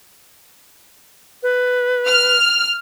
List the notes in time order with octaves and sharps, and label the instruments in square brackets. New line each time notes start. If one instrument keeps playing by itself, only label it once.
[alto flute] B4
[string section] F6